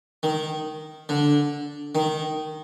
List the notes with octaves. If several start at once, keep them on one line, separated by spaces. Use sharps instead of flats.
D#3
D3
D#3